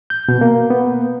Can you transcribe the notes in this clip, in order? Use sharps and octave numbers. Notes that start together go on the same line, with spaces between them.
G6
B2
A#3
B3